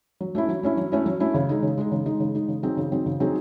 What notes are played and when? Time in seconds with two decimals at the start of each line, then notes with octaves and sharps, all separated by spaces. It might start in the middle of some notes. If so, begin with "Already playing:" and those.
0.21 F#3
0.35 A3 C#4 E4
0.49 F#3
0.63 A3 C#4 E4
0.77 F#3
0.92 A3 C#4 E4
1.06 F#3
1.20 A3 C#4 E4
1.34 C#3
1.49 G#3 D#4
1.63 C#3
1.78 G#3 D#4
1.92 C#3
2.06 G#3 D#4
2.20 C#3
2.35 G#3 D#4
2.48 C#3
2.63 F#3 C4 D#4 G#4
2.77 C#3
2.92 F#3 C4 D#4 G#4
3.06 C#3
3.20 F#3 C4 D#4 G#4